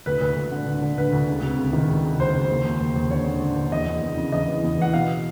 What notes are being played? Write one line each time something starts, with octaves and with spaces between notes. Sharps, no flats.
D2 B4
D2 B4
D2
D3
D3
D3
D3 B4
D2
C#2
C3
C#2
D#3
C#2
C#2
C#2 C5
C#2
D#2
D#2
D#2
D#2
D3 C#5
D3
D3
D3
E2 D#5
E2
E2
C#3
E2 D#5
E3
E2
E3 F#5
B2 F5